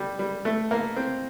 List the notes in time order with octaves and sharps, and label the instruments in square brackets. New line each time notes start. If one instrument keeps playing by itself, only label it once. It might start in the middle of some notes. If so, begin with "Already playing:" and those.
Already playing: [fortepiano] G3
G3
A3
A#3
C4